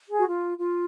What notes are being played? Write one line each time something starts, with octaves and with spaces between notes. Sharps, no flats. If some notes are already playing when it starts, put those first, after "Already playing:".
G#4
F#4
F4
F4